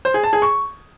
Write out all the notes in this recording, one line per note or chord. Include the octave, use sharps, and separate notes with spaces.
C5
G#4
A5
G#4
C#6